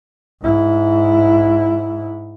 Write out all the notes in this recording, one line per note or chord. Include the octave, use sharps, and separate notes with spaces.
G#2 E4